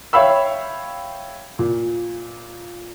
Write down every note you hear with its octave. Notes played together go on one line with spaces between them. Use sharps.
C#5 E5 F5 G5 B5 E6
A#2